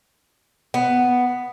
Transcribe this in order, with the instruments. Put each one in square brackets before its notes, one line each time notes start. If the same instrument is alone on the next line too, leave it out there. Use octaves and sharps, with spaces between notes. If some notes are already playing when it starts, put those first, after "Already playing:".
[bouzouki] B3